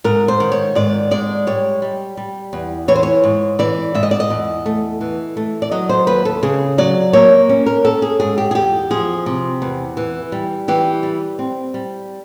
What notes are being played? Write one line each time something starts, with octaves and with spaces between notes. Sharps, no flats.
G#2 A#4
C5
D#3
C#5
G#2 D5
G#3 D5
G3 C#5
G3
G3
E2
E3 C#5
C5
C#5
G#2
E3 D5
G#2 E5
D#5
D5
D#5
E2
A3
E3
A3
D5
F#3 D#5
C5
D#2 B4
A4
C#3 G#4
F#3 D5
A#3 C#5
C#4
A#4
C#4 A4
G#4
G#2 G#4
G4
G#4
E2 G4
F3 G#4
C3
E2
E3
G3
E3 G4
G3
C4
G3